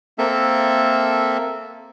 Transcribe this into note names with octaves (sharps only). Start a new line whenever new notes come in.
A#3 C4 A4 E5